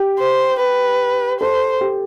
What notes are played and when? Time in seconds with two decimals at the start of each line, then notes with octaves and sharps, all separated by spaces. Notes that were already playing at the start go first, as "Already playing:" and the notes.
Already playing: G4
0.19 C5
0.60 B4
1.40 A4 C5
1.81 G4